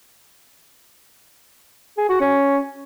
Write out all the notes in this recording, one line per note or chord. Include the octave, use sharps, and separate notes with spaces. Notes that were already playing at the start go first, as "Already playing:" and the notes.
G#4
F#4
C#4